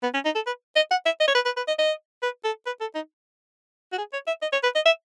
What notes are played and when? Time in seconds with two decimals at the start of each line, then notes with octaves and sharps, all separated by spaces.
0.03 B3
0.14 C#4
0.25 D#4
0.35 A4
0.47 B4
0.76 D#5
0.91 F#5
1.06 E5
1.20 D#5
1.28 C#5
1.35 B4
1.45 B4
1.57 B4
1.68 D#5
1.79 D#5
2.22 B4
2.44 A4
2.66 B4
2.81 A4
2.95 D#4
3.92 F#4
3.98 G#4
4.13 C#5
4.27 E5
4.42 D#5
4.52 C#5
4.63 B4
4.75 D#5
4.86 E5